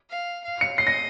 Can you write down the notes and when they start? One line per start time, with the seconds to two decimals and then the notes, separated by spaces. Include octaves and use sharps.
0.09 F5
0.44 F5
0.61 C#7
0.78 D#5 C7
0.87 A#6